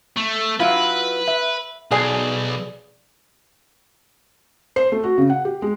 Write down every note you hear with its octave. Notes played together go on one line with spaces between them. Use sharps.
A3
F#3 E4 F4 B4
E5
B1 G#4 D5 G#5
C5
A3
F#4
C#3
F#5
G4
G#3